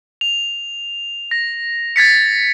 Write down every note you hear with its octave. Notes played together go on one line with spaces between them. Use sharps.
F7
A#6
G#6 A6 B6 C#7